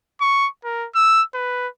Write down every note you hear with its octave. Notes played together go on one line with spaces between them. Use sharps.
C#6
A#4
E6
B4